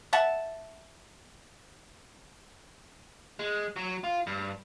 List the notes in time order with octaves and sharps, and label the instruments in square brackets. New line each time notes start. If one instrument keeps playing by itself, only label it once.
[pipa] E5 F#5 A5
[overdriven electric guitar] G#3
F#3
F4
G2